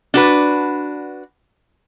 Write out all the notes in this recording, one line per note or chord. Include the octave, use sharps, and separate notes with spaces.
D4 F#4 B4